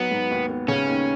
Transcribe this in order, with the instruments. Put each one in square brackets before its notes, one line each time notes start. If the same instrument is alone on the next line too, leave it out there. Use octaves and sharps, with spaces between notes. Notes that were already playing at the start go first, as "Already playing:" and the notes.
Already playing: [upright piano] F#3 D#4 F#4 [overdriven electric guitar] B3
[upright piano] G#2
D#2
B3
[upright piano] C#3 [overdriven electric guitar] C#4
[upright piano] D#2